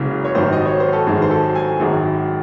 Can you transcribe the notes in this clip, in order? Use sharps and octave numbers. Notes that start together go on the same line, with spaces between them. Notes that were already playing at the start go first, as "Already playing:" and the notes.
Already playing: F#1 F#2 C#3 G#3
C#5
G#1 F#2 D#3 C5
D#5
C#5
C5
A4
G#1 F#2 D#3 G#4
C5
A4
G#5
G#1 F#2 D#3 G#3